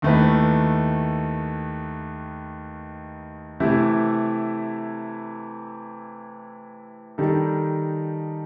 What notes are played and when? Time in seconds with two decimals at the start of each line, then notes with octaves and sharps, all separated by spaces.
0.02 D#2 D#3 A3 E4 B4
3.60 C3 E3 A3 E4
7.18 D#3 G3 D#4 A4